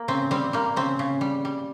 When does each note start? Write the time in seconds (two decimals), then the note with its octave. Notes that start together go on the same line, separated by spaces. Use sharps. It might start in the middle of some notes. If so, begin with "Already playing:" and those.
Already playing: A#3
0.08 C#3 C4
0.31 G3 C4
0.53 G3 A#3
0.76 C#3 C4
0.99 C#3
1.21 G3
1.45 G3